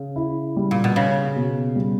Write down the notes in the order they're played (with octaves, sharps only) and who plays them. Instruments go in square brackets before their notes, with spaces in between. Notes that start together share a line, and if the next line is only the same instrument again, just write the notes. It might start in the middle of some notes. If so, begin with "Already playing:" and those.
Already playing: [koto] C#3
[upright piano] E4
G3
[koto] A#2
B2
[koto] C#3 [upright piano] C#4
[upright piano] B2
G3